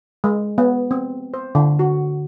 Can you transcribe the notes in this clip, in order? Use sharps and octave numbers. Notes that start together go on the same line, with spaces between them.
G#3
B3
C4
C5
D3
F#4